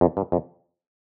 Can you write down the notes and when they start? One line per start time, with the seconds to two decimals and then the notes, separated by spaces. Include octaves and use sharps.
0.01 F2
0.17 G2
0.32 F2